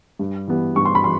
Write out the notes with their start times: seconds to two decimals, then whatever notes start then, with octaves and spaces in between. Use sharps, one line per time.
0.19 G2
0.48 E3 G3 B3
0.76 G2 C#6
0.85 C6
0.95 B5
1.04 E3 C6